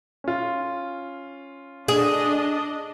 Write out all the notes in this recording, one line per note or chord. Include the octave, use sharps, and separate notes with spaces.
C#4 F4
D4 G#4 D#5